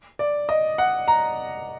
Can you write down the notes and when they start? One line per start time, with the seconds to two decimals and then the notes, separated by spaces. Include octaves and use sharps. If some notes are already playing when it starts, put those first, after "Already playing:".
0.19 D5
0.49 D#5
0.78 F#5
1.08 A#5